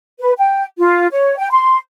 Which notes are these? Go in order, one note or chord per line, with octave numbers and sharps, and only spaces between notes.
B4
G5
F4
C#5
G5
C6